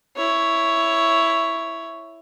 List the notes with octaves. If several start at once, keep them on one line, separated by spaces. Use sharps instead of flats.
E4 C#5